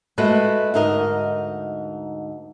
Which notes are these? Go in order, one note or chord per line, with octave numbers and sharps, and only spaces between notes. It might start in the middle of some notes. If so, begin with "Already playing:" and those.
G#3 A3 F#4 B4 E5 F#5
D2 G#2 D#4 A#4 D#5